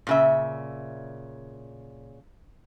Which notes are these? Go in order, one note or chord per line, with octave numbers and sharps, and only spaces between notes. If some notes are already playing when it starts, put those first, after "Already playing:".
A#2 C#3 E5